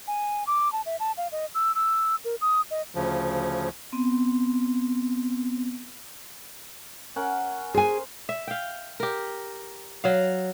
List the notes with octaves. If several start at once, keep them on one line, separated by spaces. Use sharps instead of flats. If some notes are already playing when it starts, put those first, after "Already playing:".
G#5
D6
A5
E5
A5
F5
D#5
E6
E6
A#4
D#6
D#5
D2 C#3 F3
B3 C4
C#4 A#4 F#5
G#4 C5 G#5
E5
F5 G5
G4 A#4
F#3 F5